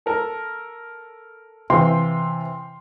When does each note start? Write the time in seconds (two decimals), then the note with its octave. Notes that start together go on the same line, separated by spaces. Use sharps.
0.06 A4 A#4 A5
1.70 C3 E3 C4 F5 G5 C6